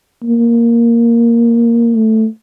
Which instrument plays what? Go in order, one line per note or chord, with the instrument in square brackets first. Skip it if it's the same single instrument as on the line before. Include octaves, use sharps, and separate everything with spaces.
[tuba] A#3
A3